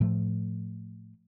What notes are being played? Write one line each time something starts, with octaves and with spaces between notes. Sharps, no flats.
A2 F3 A3